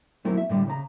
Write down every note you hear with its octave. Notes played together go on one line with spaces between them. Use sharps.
F#3 A3 A#3 C4 E4
E5
A2 D3 G3
C#3 A#5